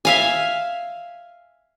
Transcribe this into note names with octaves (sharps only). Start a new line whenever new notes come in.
E5 F5 G#5